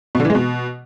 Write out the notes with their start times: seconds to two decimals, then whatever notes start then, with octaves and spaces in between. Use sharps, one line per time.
0.15 B2
0.20 D3
0.25 E3
0.30 G#3
0.35 B2